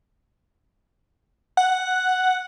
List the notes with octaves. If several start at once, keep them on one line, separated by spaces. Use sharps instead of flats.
F#5